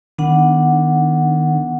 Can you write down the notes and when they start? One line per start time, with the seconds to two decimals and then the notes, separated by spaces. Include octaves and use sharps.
0.18 D#3 B3 D4 F#5